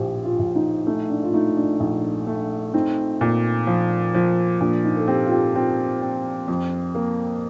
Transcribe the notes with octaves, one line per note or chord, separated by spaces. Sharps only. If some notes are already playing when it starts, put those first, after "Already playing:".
Already playing: A#1 A2 G4 C5
F4
A#1
D#4
A3 D#4
D4
F4
A3 D#4
D4
A#1 D#4
A3
C4 D#4
A#2
F3
F3
A#2 D4
D#4
A4
C4 G4
F4
G4
C4 F4
C4
F2
A#3